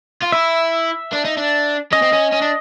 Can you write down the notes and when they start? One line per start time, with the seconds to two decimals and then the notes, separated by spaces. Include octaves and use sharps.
0.22 F4
0.32 E4 E5
1.13 D4
1.25 D#4
1.37 D4
1.92 C#4 D#5
2.02 C4
2.13 C#4
2.32 C#4
2.42 D4